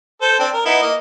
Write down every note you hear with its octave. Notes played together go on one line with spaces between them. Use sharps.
A4 C5
C4 D4
A#4
B3 D#4 E4
A#3 D#5